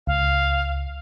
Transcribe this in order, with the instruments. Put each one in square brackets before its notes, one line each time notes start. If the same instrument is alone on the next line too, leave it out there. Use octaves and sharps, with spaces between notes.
[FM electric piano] C#2 [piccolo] F5